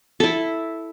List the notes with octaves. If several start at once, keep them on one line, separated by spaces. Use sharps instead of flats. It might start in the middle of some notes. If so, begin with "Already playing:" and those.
E4 A4